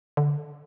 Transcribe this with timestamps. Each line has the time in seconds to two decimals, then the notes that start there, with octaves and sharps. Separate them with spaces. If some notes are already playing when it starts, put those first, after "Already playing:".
0.17 D3